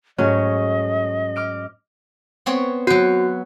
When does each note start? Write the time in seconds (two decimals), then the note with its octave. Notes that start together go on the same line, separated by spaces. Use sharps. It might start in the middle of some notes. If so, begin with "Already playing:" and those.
0.18 G#2 F#3 A3 C#4 D#5
1.36 D6 F6 D7
2.46 B3 C4 C#5
2.87 F#3 F#4 B4